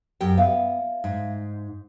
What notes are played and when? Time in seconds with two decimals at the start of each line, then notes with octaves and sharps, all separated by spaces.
0.21 F#2 G4 G5
0.38 B3 E5 F5
1.04 G#2